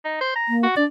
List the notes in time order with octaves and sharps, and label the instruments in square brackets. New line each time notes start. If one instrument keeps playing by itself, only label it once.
[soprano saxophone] D#4
C5
A#5
[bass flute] A#3
[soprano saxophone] F#4
[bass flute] D4 [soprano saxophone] D5